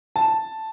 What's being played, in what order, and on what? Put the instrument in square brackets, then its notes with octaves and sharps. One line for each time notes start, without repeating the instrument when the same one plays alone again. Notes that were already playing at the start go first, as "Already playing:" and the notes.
[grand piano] A5